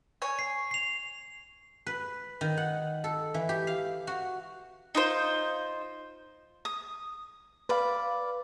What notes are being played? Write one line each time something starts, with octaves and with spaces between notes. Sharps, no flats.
C#5 G#5
C7
C7 F7
B4
D#3
F#5
A4
E3
G4
F5
F#4
D#4 F4 C5
D#6
B4 D5 F5 B5